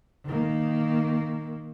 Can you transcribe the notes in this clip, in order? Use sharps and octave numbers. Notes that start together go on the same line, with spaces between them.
D#3 A#3